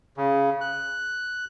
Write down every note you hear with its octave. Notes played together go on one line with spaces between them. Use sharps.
C#3
F#6